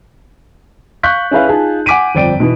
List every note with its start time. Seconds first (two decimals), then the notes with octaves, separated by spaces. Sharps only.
1.03 F5 C#6 F#6 G6 B6
1.31 C#4 E4 G#4 B4 F5
1.48 D#4 F4 G#4 A5
1.86 F#5 G#5 D6 B6 D7 D#7
2.15 G1 F2 C4 D5 G5 D7
2.40 B2 E3 B3